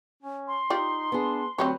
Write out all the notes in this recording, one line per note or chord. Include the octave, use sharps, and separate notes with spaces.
C#4
C6
D#4 F4 G4 D5
B3 D4 G#4
D2 F#3 C4 G4 B4 C#5